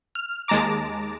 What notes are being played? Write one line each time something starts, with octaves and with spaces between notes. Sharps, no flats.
F6
D#2 G#3 A5 A#5 D6